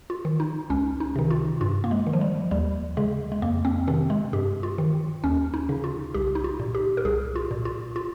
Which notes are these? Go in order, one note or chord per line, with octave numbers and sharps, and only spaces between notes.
F4
D#3
D#4
C#2 C#4
D#4
C3 D#3
F4
G2 F4
A#3
G#3
D#3
F3
G3
D#2 G3
C#3 G#3
G#3
F2 A#3
C4
C3 D#3 C4
G#3
G2 G4
F4
D#3
D#2 C#4
D#4
C#3
F4
C2 G4
D#4
F4
A#2
G4
A#4
C2 G#4
F4
A#2
F4
F4